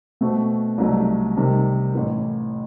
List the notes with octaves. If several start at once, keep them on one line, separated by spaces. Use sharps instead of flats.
B2 A3 C4 F#4 A4
C2 C3 F#3 A3 D#4
C3 D#3 G3
A1 A2 E3